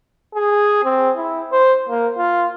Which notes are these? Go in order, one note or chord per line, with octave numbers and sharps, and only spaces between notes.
G#4
C4
E4
C5
A#3
F4